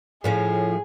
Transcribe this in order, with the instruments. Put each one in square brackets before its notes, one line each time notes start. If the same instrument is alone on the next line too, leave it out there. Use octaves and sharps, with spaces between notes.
[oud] A2 F3 C#4 [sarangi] G#4